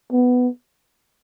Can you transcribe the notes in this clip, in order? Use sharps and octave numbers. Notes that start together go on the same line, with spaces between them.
B3